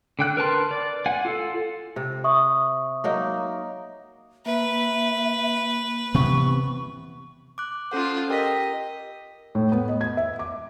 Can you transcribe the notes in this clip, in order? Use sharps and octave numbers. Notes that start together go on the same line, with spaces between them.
D3 G5 F#6
A#4 B4 A5 C6
D5
F#5 G#5
F4 A4
C3
E5 C#6 D#6
F#3 A#3 D#4
A#3 B4 E5
C3 E3 B3 C#6
D6 F#6
C#4 F4 A4 C5 F#5
G4 A#4 D#5 B6
A2
B3
D#5
G#6
E5
D6